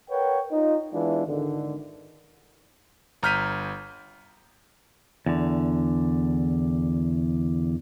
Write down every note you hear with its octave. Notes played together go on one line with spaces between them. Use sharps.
A#4 B4 C#5 F#5 G5
D#4 F4 D#5
E3 G#3 B3 D4 E4 F4
G#1 D3 D#3
G1 A#5 F6 G6 B6 D#7
E2 D3